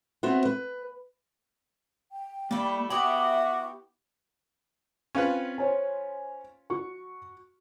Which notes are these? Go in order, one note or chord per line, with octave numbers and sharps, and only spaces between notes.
B3 C4 F#4 E5
B4
G5
G3 A3 A#3 E4
B3 E4 F#4 G4 E5 B5 D6
C4 C#4 F4 B4
C5 C#5 G#5
F#4 C#6